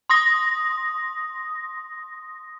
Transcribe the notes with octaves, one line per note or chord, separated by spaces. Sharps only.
C6 D#6 A#6